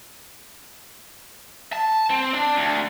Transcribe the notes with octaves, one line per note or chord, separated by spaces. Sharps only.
A5
C4
D4
D2